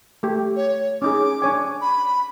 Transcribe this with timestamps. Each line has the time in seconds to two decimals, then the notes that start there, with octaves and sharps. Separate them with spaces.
0.23 A3 G4
0.56 C#5
1.02 C#4 D#4 G#4 D6
1.42 D4 C#5 G#5
1.82 B5